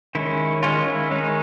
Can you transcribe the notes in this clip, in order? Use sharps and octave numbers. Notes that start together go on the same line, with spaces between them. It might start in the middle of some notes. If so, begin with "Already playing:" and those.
D#3 G#3 C#4 E4
D#3 G#3 C#4 F4
E4
D#3 G#3 C#4 D#4